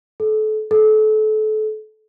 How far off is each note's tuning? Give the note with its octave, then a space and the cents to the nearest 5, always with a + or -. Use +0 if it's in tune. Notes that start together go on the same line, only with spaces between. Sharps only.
A4 -30
A4 -30